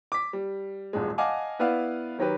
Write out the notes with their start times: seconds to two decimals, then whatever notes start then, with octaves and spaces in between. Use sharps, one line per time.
0.12 D6 B6
0.33 G3
0.93 D#1 A1 G#3
1.18 D#5 F5 F#5 G#5 A5 D6
1.59 B3 E4 B4 D5 F5 F#5
2.18 D#3 F#3 G4 B4